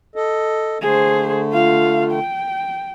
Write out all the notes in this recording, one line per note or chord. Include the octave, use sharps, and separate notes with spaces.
A4 D#5
D3 A3 G#4 C5
F4 F5
G5